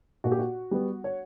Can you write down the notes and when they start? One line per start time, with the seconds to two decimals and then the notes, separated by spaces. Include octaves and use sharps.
0.24 A#2 F#4
0.32 G4
0.39 F#4
0.71 G3 B3
1.04 C#5